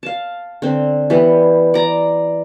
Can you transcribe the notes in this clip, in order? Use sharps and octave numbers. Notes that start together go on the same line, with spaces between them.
F5 A5
D3 C4
E3 G3 B3 B4
D5 A#5